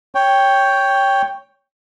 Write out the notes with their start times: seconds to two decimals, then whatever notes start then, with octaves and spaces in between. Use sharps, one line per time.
0.15 C#5 G5